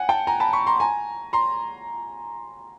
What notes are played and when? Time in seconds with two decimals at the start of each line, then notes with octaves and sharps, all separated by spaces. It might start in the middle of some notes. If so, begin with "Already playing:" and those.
Already playing: F#5 G#5
0.09 G5 A5
0.27 G#5 A#5
0.40 A5 B5
0.53 B5 C#6
0.67 A#5 C6
0.80 G#5 A#5
1.33 A#5 C6